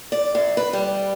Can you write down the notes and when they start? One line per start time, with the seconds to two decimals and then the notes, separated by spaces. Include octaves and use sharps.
0.12 D5
0.35 F#2
0.57 B4
0.73 G3